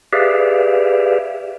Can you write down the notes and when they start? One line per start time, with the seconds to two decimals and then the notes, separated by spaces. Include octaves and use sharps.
0.13 G4 G#4 B4 D5 E5 F5